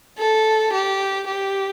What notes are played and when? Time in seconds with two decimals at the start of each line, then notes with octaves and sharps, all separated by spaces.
0.19 A4
0.73 G4
1.27 G4